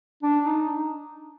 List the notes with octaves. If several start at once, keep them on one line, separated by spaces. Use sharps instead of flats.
D4
D#4